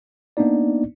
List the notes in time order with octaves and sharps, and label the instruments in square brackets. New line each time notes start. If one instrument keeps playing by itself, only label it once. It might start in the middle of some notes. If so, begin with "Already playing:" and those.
[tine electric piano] A#3 B3 D4 D#4 D5